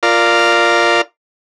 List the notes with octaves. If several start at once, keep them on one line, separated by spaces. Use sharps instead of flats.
F4 A#4 D5 F5